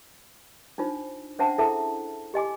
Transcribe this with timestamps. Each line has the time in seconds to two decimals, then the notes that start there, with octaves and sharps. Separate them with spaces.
0.78 D4 D#4 F4 C5
1.39 C#4 D4 C5 E5 F#5 A5
1.58 E4 G#4 A4 E5 A5
2.34 G4 D#5 G#5 D6